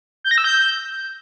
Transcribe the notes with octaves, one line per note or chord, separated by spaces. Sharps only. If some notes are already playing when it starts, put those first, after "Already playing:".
G6
A#6
E6
G6